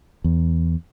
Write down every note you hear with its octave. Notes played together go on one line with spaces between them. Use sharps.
E2